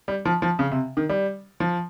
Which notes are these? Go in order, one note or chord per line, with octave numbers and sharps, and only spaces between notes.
G3
F3
F3
C#3
C3
D#3
G3
F3